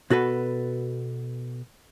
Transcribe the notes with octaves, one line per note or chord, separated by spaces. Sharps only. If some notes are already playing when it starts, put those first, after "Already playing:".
B2 F#4 A4 B4